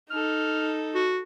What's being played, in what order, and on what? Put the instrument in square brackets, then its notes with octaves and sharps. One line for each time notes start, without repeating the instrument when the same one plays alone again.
[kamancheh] D#4 A4 [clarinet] F6
[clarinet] F#4